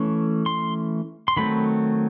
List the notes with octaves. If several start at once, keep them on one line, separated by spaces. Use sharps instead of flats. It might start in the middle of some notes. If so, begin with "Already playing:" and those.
Already playing: E3 A3 C#4
C6
C6
D#3 F#3 A3 C4 B5